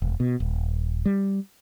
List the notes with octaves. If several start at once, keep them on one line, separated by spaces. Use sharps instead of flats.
E1
B2
D#1
G3